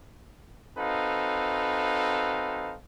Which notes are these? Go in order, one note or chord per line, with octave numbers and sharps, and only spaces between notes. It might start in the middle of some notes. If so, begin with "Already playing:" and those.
C4 D#4 F#4 A4 B4 F5